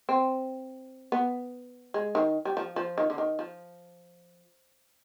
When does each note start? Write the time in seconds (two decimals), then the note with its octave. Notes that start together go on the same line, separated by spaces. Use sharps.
0.09 C4
1.12 B3
1.94 G#3
2.15 D#3
2.45 G3
2.57 F3
2.76 F3
2.98 D#3
3.10 D3
3.18 D#3
3.39 F3